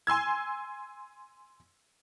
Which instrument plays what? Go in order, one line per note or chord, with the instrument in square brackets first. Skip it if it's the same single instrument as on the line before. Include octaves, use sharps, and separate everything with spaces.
[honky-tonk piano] G#5 C6 E6 G#6